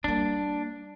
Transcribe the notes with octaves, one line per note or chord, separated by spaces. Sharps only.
G3 A#3 D4